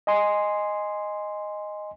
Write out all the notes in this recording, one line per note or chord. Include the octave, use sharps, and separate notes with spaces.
D#5 G#5 C6